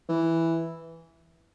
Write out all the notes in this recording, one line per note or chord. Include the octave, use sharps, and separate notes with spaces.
E3